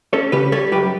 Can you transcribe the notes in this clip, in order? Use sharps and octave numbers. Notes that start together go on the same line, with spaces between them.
C#4 A4 C#5
C#3 G4 B4
G3 A4 C#5
F#2 G4 B4